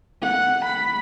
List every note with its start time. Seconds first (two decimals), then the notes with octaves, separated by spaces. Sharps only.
0.22 F#5
0.65 B5